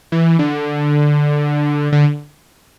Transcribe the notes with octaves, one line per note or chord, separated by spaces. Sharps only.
E3
D3
D3